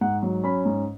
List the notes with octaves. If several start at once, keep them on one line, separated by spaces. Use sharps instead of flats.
G#2 F#5
F#3
C#4 B5
G#2